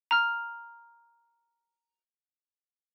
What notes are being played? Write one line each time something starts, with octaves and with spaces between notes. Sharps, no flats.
A#5 F6